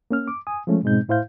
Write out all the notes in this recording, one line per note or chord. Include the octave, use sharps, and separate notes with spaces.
A#3 C#4 F6
D6
G#5 D#6
F3 G#3 A3 C#4
G#2 B2 G#3 C4 D#4 G6
A2 E4 C5 F5 G6